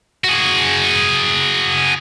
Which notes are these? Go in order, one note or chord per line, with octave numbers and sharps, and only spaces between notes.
F#4 G#4